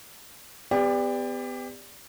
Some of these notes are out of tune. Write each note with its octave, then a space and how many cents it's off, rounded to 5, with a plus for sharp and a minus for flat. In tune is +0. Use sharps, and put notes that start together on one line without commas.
B3 +30 G4 +30 D5 +0